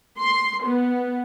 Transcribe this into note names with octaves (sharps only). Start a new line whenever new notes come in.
C6
B3